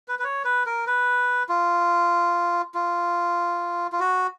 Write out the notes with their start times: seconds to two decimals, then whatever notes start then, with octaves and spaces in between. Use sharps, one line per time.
0.08 B4
0.19 B4
0.24 C#5
0.45 B4
0.66 A#4
0.87 B4
1.49 F4
2.74 F4
3.92 F4
4.00 F#4